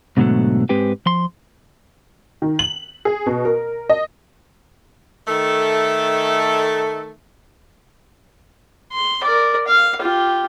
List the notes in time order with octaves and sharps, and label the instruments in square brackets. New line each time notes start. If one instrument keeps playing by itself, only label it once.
[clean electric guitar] G#2 B2 D3 D#3 F#3 A3
G#2 G#3 C4 G4 B4 G5
F3 C6
[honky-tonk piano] D#3
F#7
G#4
B2
A#4
D#5
[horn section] D#3 A3 A4
[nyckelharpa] C6
A#4 D5
F5
F4 G4